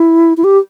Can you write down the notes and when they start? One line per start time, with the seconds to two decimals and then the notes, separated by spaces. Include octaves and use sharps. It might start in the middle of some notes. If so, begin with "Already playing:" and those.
Already playing: E4
0.37 E4
0.44 G4